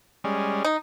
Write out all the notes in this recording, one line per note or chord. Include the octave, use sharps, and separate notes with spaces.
G3 G#3 C#4
D#4